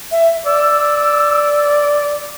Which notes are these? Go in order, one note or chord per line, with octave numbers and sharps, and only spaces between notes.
E5
D5 E6